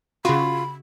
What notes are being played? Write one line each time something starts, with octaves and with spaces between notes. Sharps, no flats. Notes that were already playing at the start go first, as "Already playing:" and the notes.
C#3 F4 F#4 B5